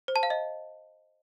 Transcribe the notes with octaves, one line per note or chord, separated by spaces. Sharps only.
C5
A5
F5
D#5